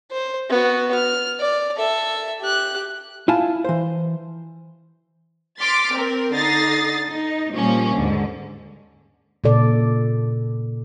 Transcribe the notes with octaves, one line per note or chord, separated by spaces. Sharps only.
C5
B3 F#4
F6
D5
A4 E5
G4 F#6
E4 F4 G#5 A5
E3 C5
C6 D6 F6 A6 B6
C4 A#4
D3 D#4 D#6 A6 A#6 C7
D#4
A#2 F3 G3 A#3 C#4
D#2 G#2 D3
A#2 C#3 A4 D5